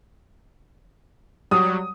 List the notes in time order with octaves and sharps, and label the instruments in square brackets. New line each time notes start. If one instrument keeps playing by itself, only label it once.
[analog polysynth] F#3 G3 [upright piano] D#6